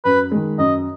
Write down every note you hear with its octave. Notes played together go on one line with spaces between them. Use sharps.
F#2 B4
D#3 G#3
F#2 D#5